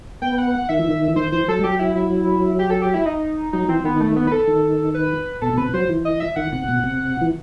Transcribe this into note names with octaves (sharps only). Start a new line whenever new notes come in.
B3 G5
F#5
F#5
D#3 E5
E3
D#3
E3
D#3 C5
E3 C5
F#3 A4
G3
F#3 G4
E4
E4
G4
A4
G4
E4
D#4
F#3 D#4
E3 C4
D#3 B3
A3
B3
B4
A4
D#3
B4
B2 A4
B2
C3 B4
F#3 C5
E3
D#5
E5
D#3 F#5
C3
B2
C3
E3